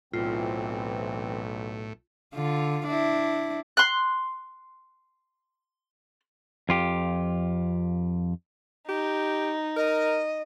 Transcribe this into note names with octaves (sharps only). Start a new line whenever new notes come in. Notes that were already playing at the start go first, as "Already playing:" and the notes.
B1 A2 E3 C4 F4
D3 F4
D4 E4
C6 F#6
F2 F4 G4
D#4 G4
A#4 D#5